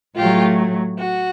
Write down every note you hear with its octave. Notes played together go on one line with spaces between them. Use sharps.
A2 F#3 A3 F4 G4
F#4